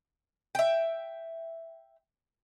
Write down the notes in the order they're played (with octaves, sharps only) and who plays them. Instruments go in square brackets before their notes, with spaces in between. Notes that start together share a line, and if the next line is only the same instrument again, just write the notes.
[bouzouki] E5 G5